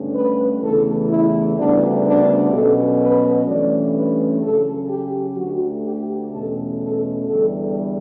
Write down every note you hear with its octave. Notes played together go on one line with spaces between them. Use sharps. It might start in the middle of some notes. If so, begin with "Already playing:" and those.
Already playing: G2 D3 A3 C#4
B4
E2 C#3 E3 A3 A4
E4
D2 C#3 G3 B3 D4
D4
B2 F#3 C#4 A4
B4
G2 E3 A3 C#4 D5
B4
C#3 F#3 C#4 A4
G4
D2 D3 A3 F#4
G4
E2 B2 A3 C#4 A4
A4
E2 D3 G3 A4